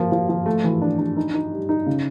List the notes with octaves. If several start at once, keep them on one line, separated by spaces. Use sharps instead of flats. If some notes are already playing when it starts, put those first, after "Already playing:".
Already playing: F3 A#3
F3
F3
A3
E3
D4
D4
D#4
D#4
G3
D#4
C#3